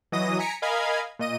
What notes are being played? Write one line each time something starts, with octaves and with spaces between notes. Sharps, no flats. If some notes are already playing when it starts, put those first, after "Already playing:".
E3 F#3 D#5 D#6 A#6 D#7
G#5 A#5 B6 C#7 D7
A#4 D#5 F5 G#5 B5 G#6
A#2 D#5 D#7